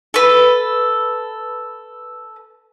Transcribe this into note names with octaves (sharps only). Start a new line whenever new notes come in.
A4 B4